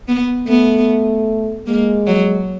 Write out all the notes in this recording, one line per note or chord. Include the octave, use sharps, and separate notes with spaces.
B3
A3 B3
G#3 A#3
F#3